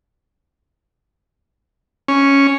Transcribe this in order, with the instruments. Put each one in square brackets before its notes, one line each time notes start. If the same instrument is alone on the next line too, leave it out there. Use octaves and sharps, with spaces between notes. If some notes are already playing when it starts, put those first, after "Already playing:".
[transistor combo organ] C#4